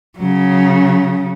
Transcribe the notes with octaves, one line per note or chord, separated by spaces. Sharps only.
C#3 F#3